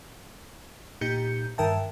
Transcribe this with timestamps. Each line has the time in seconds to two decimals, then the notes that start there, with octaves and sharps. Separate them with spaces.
1.01 A#2 D#4 G4 G6 C#7
1.58 G2 D#3 A#4 E5 G5 A5